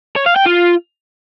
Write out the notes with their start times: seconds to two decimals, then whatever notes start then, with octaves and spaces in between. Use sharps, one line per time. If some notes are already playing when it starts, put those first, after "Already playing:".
0.16 C#5
0.26 F5
0.36 G5
0.46 F4